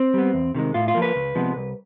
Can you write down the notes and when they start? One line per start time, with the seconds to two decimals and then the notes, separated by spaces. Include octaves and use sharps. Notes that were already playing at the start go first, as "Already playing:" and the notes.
Already playing: C4
0.14 G3 B3
0.34 E2
0.55 C3 D#3 G#3
0.74 A2 F4
0.88 F4
0.95 F3 A#3
1.02 B4
1.16 C#2
1.35 C3 F3 G#3 B3
1.56 C2